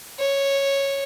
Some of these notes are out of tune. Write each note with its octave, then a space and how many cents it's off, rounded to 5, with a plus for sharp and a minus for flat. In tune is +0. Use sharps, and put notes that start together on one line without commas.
C#5 -5